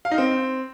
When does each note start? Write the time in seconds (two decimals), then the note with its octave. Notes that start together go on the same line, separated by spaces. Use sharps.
0.05 F5
0.11 D#4
0.18 C4